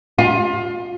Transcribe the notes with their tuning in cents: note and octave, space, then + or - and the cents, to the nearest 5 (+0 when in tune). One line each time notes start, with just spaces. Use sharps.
F4 +25